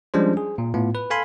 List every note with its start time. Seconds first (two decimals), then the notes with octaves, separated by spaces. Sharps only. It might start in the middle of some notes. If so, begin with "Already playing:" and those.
0.14 F3 G3 G#3 C#4 D4 C5
0.37 G#4
0.58 A#2
0.74 A2 B3 F4
0.95 B4
1.10 A4 F5 G#5 B5 C6